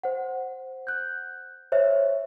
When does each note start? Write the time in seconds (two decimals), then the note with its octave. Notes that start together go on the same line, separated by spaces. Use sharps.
0.04 C5 F#5
0.87 F#6 G6
1.72 C5 C#5 E5